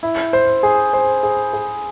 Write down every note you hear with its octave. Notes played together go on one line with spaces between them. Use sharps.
E4
C5
G#4
C5
G#4
G#4